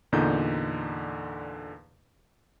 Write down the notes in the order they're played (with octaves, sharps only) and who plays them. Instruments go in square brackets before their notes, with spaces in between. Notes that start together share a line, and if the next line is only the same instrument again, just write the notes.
[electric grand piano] E2 A#2 D3 D#4 G6